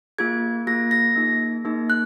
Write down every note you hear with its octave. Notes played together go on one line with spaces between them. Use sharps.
A#3 F4 G#4 G#6
A#3 F4 G#4 A#6
A#6
A#3 D#4 G#4
A#3 D#4 G#4
F#6